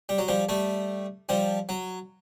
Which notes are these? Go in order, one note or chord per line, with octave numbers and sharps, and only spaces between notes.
G3
F#3
F3 G3
G3 A3
F3 G3
F#3